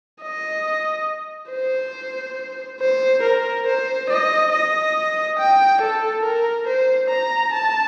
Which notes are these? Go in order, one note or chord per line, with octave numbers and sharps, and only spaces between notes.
D#5
C5
C5
A#4
C5
D#5
D#5
G5
A4
A#4
C5
A#5
A5